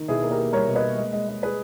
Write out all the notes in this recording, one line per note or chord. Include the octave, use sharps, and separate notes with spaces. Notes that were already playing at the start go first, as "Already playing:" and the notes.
Already playing: D#3
B2 E4 G#4
A#3
G4 A#4
A#3
G3 A#4 C#5
B2
B4 D#5
A#3
G#3
G#3
G#3
G#4 B4